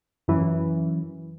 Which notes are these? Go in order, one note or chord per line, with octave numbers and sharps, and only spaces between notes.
F#2 E3